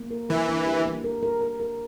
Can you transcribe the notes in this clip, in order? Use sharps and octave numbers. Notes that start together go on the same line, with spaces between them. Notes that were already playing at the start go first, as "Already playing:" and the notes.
Already playing: A#3
A#4
E3 A#4
D4
G4
A#3
A#4
A#4
A#4
A#4